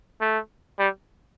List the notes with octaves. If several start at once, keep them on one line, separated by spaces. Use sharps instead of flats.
A3
G3